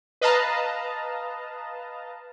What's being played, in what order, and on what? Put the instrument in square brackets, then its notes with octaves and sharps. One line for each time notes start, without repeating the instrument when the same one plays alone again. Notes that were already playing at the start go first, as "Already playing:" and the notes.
[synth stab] B4 D#5 F5 A5 A#5